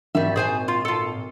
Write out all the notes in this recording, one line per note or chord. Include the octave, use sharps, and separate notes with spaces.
G#1 E3 G3 E5
A#2 G#4 C5 G#5
F4
F4 A4